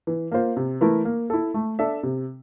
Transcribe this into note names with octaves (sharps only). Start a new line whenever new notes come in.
E3
A#3 F4 C5
C3
E3 A3 E4 A#4
A#3
E4 A4
A3
D4 A4 E5
C3